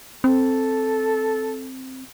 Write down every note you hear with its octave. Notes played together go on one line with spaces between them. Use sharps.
C4 A4